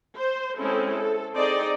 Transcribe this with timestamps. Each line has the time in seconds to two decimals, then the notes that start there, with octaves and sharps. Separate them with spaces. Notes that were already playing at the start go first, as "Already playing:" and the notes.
0.17 C5
0.58 G#3 C4 C#4 E4 A4
0.91 A4
1.35 C4 D#4 G#4 D5 D#5